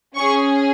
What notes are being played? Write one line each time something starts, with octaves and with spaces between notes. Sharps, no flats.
C#4 G#4 C#6